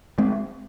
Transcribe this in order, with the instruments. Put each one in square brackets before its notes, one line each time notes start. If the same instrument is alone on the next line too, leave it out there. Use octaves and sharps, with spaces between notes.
[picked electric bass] G#3 C4